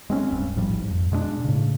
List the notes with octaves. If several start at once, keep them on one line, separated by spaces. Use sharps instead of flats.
G#3 C4 C#4
D1 G2
A1 G#2 F3 G3
F2
B2 G#3 A#3 D4
A2 C#3